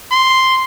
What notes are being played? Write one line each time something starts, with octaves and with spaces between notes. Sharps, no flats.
C6